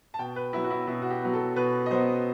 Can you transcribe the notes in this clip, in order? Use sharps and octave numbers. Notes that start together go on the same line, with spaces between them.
A5
B2 G5
B4
F#3 B3 E4
F#4
E4
B2 E4
F#4
G4
F#3 B3
A4
B2 B4
D#5
F#3 B3 C5